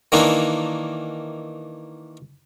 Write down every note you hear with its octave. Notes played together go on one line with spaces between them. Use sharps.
D#3 E3 A#3 D4 E4